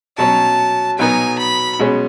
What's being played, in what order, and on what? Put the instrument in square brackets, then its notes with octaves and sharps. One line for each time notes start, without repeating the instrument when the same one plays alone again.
[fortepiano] B2 F#3 C#4 [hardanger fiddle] A5
[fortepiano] B2 F#3 B3 D#4 [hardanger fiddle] G#5
[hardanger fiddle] B5
[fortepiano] B2 G#3 C#4